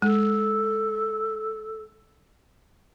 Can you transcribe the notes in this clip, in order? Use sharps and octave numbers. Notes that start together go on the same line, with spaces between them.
G#3 A4